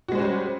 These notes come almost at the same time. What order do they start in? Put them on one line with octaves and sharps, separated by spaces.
F#4 G#3 C5 C#4 G3